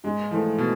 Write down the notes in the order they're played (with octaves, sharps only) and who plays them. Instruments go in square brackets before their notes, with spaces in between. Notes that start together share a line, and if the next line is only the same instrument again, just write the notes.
[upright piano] G#2 [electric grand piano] G#3
[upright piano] E3 A3 [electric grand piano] F3
[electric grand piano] B2